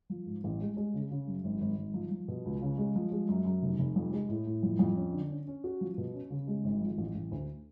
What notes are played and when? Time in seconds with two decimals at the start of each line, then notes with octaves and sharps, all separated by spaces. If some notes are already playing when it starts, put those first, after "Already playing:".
0.10 F3
0.26 G#2
0.44 A1
0.61 G#3
0.77 G#3
0.94 C#3
1.11 C#3
1.27 F#2
1.44 G#1
1.61 G#1
1.77 G#1
1.94 F3
2.11 F3
2.28 B2
2.45 C#2
2.62 C#3
2.78 G#3
2.96 F3
3.12 G#3
3.29 F#2
3.45 F#2
3.62 F1
3.79 F1
3.96 F2
4.13 G#3
4.29 A2
4.46 A2
4.63 F2
4.79 F2
4.96 C#4
5.13 D3
5.30 C#4
5.47 C#4
5.64 F#4
5.81 F3
5.98 B2
6.14 C#4
6.30 C#3
6.47 G#3
6.64 G#1
6.81 F3
6.98 A1
7.15 A1
7.31 D2